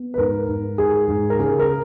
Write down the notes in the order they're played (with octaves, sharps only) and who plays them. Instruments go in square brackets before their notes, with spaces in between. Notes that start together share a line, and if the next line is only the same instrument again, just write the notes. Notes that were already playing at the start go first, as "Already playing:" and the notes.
Already playing: [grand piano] B3
B4
G#2 A#4
G#2
G#2 G#4
G#2
A#4
C#3 G#4
A#4